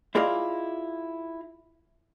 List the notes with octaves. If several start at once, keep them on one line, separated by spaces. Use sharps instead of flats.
E4 F4 G#4 D5 D#5 F5